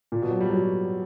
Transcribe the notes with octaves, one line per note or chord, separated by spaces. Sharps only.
A#2
B2
F#3
G3
F#3